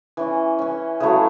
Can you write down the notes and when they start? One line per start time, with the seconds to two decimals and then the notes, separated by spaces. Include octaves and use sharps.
0.17 E3 C#4
0.59 E3 C#4
1.00 C#3 F#3 A3 E4